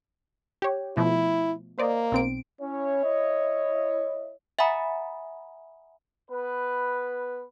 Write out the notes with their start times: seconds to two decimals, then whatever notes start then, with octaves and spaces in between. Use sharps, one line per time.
0.62 G4 C#5
0.97 B2 F3 A3 E4
1.79 A#3 C5 D5 D#5
2.12 B1 C4 D7
2.61 C#4 E4 C#5
3.04 D#5
4.59 E5 F#5 G#5 A#5 B5 D#6
6.31 B3 B4